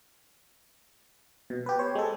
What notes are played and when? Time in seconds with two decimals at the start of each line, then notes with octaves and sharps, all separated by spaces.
1.50 B2
1.66 G4 B4
1.79 C5 C#5
1.95 G#3 A4